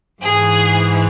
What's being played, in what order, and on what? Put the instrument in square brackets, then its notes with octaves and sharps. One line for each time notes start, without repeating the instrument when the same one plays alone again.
[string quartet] G#2 E3 G#4